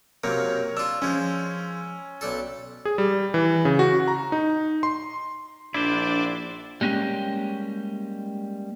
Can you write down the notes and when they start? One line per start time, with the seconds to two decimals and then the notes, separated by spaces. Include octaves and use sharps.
0.24 F#2 C3 A#3 A#4 C#5
0.77 D4 F4 E6
1.02 F3 G#3 C#4
2.21 B1 D4 A4
2.85 G#4
2.98 G3
3.34 E3
3.65 C#3
3.79 F#4
4.08 A#5
4.32 D#4
4.83 C6
5.74 A#1 D4 E4 C5
6.81 G3 G#3 A#3 C#4 G4